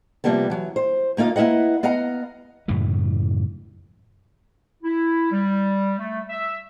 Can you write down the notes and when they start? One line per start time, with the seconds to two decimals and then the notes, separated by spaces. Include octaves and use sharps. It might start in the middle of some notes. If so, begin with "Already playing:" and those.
0.24 C3 D#3 F3 G3 A#3 B3
0.50 E3 F#3
0.76 C5
1.17 D2 A#3 D#4 F4 F5
1.36 A#3 E4 B4 D#5 F#5
1.83 B3 D#5 F5 F#5 A#5
2.68 F#2 A2 C#3 E3
4.83 E4
5.31 G3
5.99 A3
6.30 E5